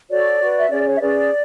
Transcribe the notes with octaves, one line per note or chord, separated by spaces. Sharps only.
F#4 A4 C#5 D5
F#4 B4
E5
C#4 G#4 C#5 D5
C#5
E5
C#4 G#4 B4 D5